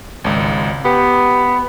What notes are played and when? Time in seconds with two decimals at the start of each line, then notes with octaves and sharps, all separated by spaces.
0.24 G#1 C#2
0.85 B3 G4